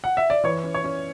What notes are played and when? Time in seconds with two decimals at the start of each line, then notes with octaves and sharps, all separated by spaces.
0.04 F#5
0.17 E5
0.30 D5
0.44 E3 C#5
0.64 C#4
0.74 C#5
0.84 C#4